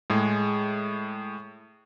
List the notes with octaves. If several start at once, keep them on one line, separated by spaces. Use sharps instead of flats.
A2 G#3 G#4